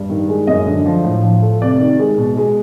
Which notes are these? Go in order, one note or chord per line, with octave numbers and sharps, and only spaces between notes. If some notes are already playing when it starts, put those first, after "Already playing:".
Already playing: G2
D#3
G#3
F#2 D#5
D3
F3
A2
F3
A3
C3 D5
D#3
G#3
B2
G#3